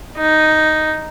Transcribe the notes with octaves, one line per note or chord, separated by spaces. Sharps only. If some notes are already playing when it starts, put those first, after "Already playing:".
D#4